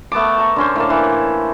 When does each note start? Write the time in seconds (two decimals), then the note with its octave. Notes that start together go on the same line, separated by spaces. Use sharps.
0.12 A3 B3 A5 D6
0.38 A5 A#5 C#6
0.56 D3 C#4 C5
0.76 A2 A#3 A5
0.90 E3